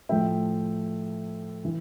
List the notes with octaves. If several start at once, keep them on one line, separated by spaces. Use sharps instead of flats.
A2 F3 A3 E5 G5
E3